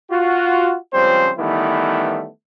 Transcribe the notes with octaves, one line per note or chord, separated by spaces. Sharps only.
F4 F#4
C#2 F3 G3 C4 C#4 C5
D#3 E3 G3 A3 B3 E4